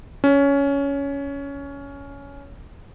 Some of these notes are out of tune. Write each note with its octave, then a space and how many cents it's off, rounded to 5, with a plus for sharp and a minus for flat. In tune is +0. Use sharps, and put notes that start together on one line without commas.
C#4 +15